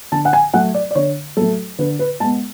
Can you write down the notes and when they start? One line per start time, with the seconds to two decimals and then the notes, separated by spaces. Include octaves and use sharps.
0.12 D3 A5
0.25 F#5
0.33 G#5
0.53 F#3 A3 F#5
0.74 D5
0.91 D5
0.95 D3 C#5
1.37 F#3 A3 A4
1.79 D3 B4
1.99 B4
2.20 G#3 A5
2.24 B3